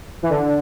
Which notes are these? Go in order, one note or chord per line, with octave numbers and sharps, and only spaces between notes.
E3
D3